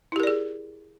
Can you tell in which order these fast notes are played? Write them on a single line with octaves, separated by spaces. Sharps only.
E4 G4 A#4 D5 G#4